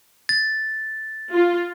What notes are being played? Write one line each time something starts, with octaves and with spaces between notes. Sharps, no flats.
A6
F4